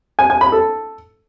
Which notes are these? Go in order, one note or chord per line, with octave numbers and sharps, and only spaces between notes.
G#5
G#5
B5
A4